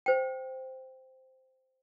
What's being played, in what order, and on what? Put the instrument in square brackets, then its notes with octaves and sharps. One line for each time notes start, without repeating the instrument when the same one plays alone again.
[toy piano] C5 G5